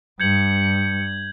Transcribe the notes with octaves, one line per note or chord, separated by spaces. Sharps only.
G2 G6 G#6 C#7 F#7